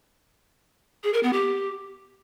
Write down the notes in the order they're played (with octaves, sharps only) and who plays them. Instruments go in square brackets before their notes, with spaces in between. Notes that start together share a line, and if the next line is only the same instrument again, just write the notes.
[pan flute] G#4
A#4
B3
G4